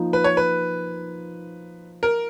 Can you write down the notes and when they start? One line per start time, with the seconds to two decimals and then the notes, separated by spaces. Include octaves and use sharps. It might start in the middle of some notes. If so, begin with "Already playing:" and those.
Already playing: F3 A#3 D#4
0.13 B4
0.24 C#5
0.37 B4
2.03 A#4